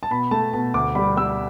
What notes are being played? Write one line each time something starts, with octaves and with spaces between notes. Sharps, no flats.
A5
B2 B5
A3 A5
B2 A5
D2 D6
G3 B5
G3 E6